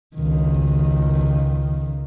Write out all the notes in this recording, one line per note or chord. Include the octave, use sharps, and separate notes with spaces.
C#2 D#3